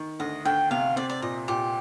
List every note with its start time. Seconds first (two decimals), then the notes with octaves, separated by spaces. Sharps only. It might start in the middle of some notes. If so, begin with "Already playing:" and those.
Already playing: D#3
0.20 D2 D#5
0.45 D2 G5
0.71 C3 F5
0.96 C4 D5
1.10 D5
1.22 A#2 D#5
1.48 A#2 G4